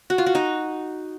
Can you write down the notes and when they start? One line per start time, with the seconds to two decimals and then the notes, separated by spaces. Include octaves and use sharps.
0.10 F#4
0.18 F4
0.26 F#4
0.35 D#4